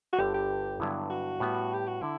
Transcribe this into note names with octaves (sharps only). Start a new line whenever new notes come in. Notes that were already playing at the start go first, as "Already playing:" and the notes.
F#4
G1 G2 D3 G4
G4
G2 D3 F#3 B3 E4
F#4
A2 G3 B3
G4
F#4
D3 E4